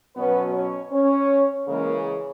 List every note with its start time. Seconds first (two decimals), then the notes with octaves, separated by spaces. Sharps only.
0.16 B2 F#3 B3 C#4 B4
0.53 C#4 C#5
0.92 C#4 C#5
1.68 C#3 E3 G#3 A#3 C#4 A#4